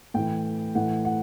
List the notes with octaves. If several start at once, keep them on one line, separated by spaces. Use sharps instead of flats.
A2 E3 G5
A2 E3 F#5
F#5